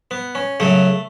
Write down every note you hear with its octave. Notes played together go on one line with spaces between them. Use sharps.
B3
C#4
F#2 C#3 F#3 A3